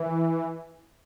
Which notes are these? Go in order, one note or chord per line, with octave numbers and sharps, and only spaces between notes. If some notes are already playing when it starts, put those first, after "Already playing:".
Already playing: E3